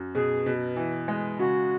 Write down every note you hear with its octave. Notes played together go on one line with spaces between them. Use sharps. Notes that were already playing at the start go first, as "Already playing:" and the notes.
Already playing: F#2
B2 G#4
B2
E3
G#3
C#3 F#4